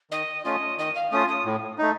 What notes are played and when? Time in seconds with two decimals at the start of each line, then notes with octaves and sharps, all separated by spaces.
0.11 D#3 D#5
0.44 A3 C#4 F4 D#5
0.78 D#3 D#5
0.95 F5
1.11 A3 C#4 F4 D#6
1.28 D#6
1.45 A2
1.78 A3 D#4